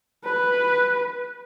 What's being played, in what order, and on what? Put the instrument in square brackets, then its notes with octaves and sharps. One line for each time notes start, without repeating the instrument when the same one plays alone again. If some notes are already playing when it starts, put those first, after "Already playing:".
[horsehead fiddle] B4